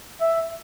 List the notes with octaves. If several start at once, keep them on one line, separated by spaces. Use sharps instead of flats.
E5